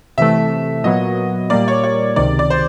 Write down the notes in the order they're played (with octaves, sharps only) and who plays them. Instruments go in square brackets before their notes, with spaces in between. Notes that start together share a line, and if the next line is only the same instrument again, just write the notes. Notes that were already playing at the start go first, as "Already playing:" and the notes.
[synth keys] C3 E3 A3 [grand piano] E5
[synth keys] A#2 F#3 B3 [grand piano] D#5
[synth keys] A#2 G3 A#3 [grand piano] D5
[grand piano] C#5
C#5
[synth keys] C#2 C3 D#3 [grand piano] D5
[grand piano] D5
C5